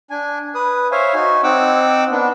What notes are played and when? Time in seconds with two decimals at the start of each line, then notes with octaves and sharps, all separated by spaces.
0.10 D4 G#5
0.55 B4 D#6
0.92 C5 C#5 E5 F5 G#5
1.14 D#4 F#4 G#5
1.43 C4 D#4 F#5 D6 E6
2.11 B3 D4